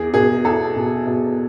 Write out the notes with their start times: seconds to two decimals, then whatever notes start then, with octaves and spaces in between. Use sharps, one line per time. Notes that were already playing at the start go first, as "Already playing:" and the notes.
Already playing: E2 G#4
0.14 B2 G#4
0.45 E2 A4
0.76 B2
1.07 B2